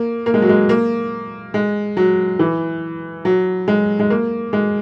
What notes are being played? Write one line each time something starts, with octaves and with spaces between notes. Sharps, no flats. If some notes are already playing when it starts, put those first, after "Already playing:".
Already playing: A#3
A#3
G#3
F#3
G#3
A#3
G#3
F#3
E3
F#3
G#3
G#3
A#3
G#3